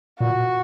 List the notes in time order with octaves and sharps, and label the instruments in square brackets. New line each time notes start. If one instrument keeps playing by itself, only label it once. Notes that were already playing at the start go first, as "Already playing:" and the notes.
[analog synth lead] A#2 [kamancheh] F#4